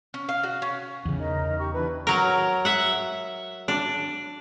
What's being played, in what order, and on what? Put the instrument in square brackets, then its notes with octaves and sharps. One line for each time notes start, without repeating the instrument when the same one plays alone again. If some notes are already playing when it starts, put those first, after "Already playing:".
[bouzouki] C#4
F5
F#4
C#4
[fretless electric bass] E2 C#3
[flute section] D#4 A#4 D#5
G4 C#6
D4 E4 B4
[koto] F#3 A#4
E5 F#5
D4